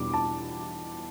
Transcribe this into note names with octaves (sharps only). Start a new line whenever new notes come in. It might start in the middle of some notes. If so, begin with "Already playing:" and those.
Already playing: E2 B2 G3 D4 D6
A5